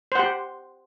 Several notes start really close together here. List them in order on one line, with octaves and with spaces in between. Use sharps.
C5 F#5 G4